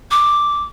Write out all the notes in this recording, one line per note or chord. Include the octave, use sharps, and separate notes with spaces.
D6